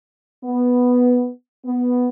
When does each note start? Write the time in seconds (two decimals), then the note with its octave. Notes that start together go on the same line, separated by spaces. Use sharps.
0.44 B3
1.65 B3